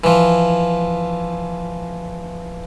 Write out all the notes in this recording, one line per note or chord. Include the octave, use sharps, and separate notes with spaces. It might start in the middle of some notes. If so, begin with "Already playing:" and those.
E3 F3